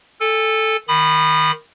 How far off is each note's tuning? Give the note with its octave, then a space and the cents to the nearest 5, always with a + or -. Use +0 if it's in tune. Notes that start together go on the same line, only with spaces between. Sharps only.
A4 +0 G#5 -30
D#3 +0 B5 +0 D#6 -35